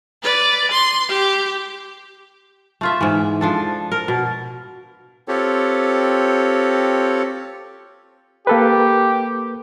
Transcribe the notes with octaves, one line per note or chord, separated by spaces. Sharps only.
B4 D5
C6
G4
A3 F4 E5
G#2 E3
F3 D4 A4
A#4
B2
C4 F4 G4 A4 C#5
A#3 G4 A4 B4